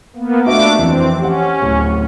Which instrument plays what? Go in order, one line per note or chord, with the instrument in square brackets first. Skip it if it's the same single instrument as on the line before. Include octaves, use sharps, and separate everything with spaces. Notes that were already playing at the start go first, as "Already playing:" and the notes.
[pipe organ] A#3 B3
[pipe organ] A3 D4 D6 [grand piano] F4 F#4 E5
[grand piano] F2 E3 [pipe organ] C4
[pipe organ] C#4 [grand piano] G4 F#5
[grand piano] D1